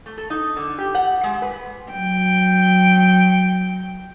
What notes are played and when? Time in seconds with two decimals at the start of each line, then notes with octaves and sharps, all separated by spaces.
0.06 A3
0.18 A4
0.30 D#4
0.57 D3
0.78 G4
0.95 F#5
1.23 G#3
1.42 B4
1.91 F#3 G5